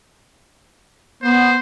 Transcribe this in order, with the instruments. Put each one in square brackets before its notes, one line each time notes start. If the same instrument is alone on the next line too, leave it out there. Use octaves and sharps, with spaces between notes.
[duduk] B3 [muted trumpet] C5